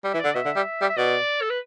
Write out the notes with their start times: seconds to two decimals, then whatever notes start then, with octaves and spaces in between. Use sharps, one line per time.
0.04 G3
0.13 E3 E5
0.20 D3 D5
0.34 B2 E5
0.45 D3
0.56 G3
0.81 G3
0.89 E5
0.97 B2 D5
1.42 A4
1.50 B4